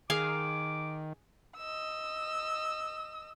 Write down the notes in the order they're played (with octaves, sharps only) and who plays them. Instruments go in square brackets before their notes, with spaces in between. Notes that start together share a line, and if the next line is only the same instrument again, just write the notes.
[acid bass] D#3 [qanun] G#4 F5 [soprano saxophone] D6
[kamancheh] D#5 E6